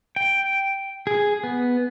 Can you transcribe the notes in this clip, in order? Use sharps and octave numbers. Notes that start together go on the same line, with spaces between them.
G5
G#4
B3